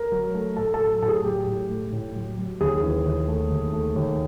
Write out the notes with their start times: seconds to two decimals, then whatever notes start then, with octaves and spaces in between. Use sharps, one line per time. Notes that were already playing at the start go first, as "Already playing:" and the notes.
Already playing: A#4
0.12 F#3
0.34 A3
0.57 A2 A4
0.74 A4
0.80 F#3
1.02 A2 A4
1.08 G#4
1.24 F#3 G4
1.47 A2
1.70 A3
1.92 A2
2.16 F#3
2.38 F#3
2.60 D#2 G#4
2.83 E3
3.05 D#2
3.28 A3
3.51 D#2
3.73 A3
3.96 D#2